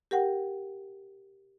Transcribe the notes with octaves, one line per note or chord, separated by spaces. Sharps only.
G4 A#4 F#5 G5